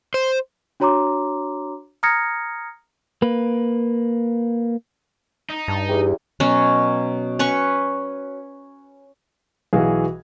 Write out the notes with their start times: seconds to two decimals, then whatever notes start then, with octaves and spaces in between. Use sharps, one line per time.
0.14 C5
0.80 D4 F#4 C#5 A#5 C6 D6
2.03 A#5 D#6 F6 G#6 A#6 C#7
3.22 A#3 B4
5.50 D#4
5.68 G2 A5
5.88 E2 G4
6.40 B2 F#3 C#4
7.39 C#4 B4 C#6
9.73 B1 E3 F#4 G#4 F5